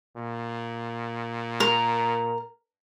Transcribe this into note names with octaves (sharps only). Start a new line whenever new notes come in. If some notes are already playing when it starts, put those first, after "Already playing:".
A#2
A#4